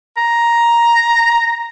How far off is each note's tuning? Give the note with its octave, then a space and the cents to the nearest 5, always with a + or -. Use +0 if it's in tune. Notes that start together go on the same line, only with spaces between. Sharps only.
A#5 +5